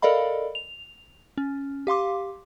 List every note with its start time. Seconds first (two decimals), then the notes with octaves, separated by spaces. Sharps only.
0.02 A4 A#4 D5 D#5 F5 B5
0.55 F7
1.38 C#4
1.87 G4 F5 C6 D6